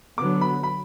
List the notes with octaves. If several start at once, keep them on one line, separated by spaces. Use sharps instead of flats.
D3 F#3 B3 D6
B5
B5